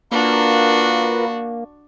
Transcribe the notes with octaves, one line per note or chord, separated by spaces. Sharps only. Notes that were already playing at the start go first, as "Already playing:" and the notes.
A#3 D4 F4 F#4 A#4 B4